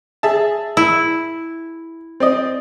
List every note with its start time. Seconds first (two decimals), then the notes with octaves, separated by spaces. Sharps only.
0.23 G#4 E5 A5
0.77 E4
2.20 C4 D5 D#5